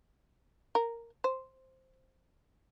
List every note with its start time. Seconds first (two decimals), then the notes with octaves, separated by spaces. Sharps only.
0.75 A#4
1.24 C5